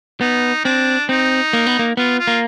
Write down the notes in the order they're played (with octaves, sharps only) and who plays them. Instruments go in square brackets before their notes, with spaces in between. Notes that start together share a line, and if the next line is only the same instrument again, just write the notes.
[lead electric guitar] B3 [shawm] D#4
[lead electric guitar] C4 [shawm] D4
[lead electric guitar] C4 [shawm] D#4
[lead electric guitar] A#3
B3
A#3
[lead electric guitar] B3 [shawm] F4
[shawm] F4
[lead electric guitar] A#3